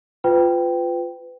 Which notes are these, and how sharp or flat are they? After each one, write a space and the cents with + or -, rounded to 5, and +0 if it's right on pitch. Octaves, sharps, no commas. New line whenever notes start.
F4 +0 B4 +30 G5 -5